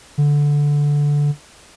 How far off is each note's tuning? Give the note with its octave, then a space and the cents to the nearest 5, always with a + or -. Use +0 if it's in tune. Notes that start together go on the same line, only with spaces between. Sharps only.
D3 -10